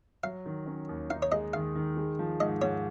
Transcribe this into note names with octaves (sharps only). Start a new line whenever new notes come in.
F#3 F5
D#3
C#4
D#2
D#4 F5
C#5
G#3 D#5
D#3 F5
D#3
G#3
F3
G#2 D#5
G#2 C#5